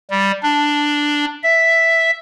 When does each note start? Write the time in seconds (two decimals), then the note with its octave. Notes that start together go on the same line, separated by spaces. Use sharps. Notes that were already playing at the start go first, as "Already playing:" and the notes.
0.11 G3
0.43 D4
1.43 E5